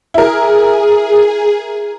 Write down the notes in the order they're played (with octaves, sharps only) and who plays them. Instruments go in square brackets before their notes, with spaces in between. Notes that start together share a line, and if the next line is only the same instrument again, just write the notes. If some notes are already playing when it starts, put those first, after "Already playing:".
[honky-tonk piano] E4 A#4 [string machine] G#4